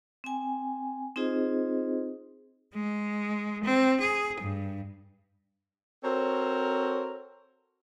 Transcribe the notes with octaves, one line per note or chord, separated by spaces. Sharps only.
C4 G5 G#5
C4 D#4 F4 G#4 C5 D#5
G#3
C4
G#4
G2
C4 F#4 A4 A#4 C5 C#5